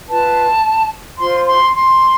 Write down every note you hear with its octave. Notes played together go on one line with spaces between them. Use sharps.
F4 B4 A5
F4 C5 C6
C6
C6